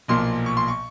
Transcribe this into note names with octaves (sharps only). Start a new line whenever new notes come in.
B1 A#2 F3 A#3 C6
C#6
C6
C#6